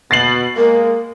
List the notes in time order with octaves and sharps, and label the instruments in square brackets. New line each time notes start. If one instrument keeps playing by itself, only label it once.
[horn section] B2 [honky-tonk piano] A6 C7 F#7
[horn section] G#3 A#3 [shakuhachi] A#4